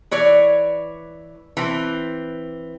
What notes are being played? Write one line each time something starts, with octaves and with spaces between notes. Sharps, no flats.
E3 C#5 D5
E3 C4